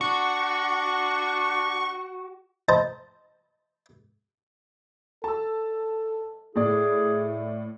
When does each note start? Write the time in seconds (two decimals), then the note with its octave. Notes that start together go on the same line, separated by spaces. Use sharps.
0.01 D4 F#4 C#6
2.69 C5 D#5 A5 A#5
5.24 A4 A5 E6
6.56 A2 E4 G#4 D5